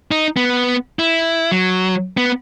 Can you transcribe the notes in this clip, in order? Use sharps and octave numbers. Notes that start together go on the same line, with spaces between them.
D#4
B3
E4
F#3
B3